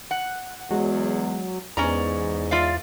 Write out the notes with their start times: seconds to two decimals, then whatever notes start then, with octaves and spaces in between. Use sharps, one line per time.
0.11 F#5
0.71 E2 F#3 G#3
1.77 E2 G#2 B3 C#4 G#4 D5 A#5
2.51 F4 D5 E5 F5